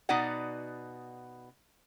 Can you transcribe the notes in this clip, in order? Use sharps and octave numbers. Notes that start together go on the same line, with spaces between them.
B2 B3 D#4 F#4 D5 F#5